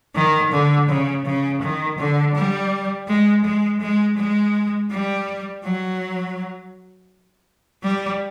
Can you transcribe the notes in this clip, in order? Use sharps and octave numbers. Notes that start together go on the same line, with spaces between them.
D#3
D3
C#3
C#3
D#3
D3
G3
G#3
G#3
G#3
G#3
G3
F#3
G3